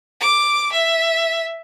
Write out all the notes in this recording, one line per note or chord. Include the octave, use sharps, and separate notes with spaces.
D6
E5